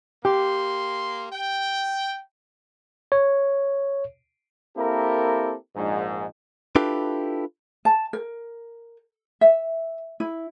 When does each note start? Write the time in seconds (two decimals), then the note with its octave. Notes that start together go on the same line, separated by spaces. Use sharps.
0.25 A#3 G4 C6
1.32 G5
3.12 C#5
4.76 A#3 C4 E4 G4 A4 A#4
5.76 A#1 G#2
6.76 D4 E4 F4 G4 A4 B4
7.85 A5
8.13 A#4
9.41 E5
10.20 E4